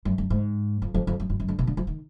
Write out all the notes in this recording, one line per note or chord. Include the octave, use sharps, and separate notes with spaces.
F#2
F#2
G#2
F2
F2
F2
F#2
F#2
F#2
D3
B2
D3
F3
D#3